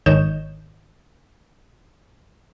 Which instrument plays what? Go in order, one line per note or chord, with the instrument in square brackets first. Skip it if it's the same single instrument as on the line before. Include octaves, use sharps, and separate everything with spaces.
[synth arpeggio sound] G#1 D#3 C#5 D#5 G6 E7